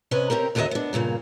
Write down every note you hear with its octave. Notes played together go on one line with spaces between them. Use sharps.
C3 C#4 B4 D#5 G#5
C4 C#4 G4 A#4
D#2 D3 F#3 B3 D#5 E5
B3 D4
G2 A#2 C#3 A#3